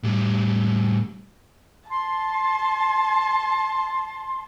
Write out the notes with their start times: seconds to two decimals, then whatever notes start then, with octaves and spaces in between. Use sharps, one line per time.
0.03 A2 G3
1.89 A5 C6